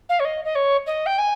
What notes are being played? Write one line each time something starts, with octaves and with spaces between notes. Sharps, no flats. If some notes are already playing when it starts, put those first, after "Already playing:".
F5
C#5
D#5
D#5
C#5
D#5
G5
G#5